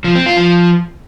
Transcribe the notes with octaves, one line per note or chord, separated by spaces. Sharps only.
F3
C4
F4
F3